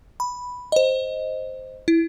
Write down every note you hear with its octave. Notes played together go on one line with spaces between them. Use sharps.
B5
C5 D#5
E4